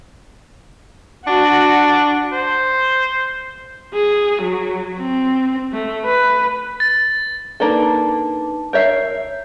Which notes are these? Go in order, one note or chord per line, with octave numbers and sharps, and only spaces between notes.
D4 F#4
C5
G#4
F#3
C4
A3
B4
A6
A#3 D4 D#4 A4 B4 A5
A#4 C#5 E5 G6 C7